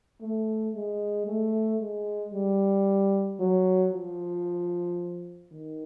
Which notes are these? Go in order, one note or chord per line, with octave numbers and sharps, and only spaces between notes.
A3
G#3
A3
G#3
G3
F#3
F3
D#3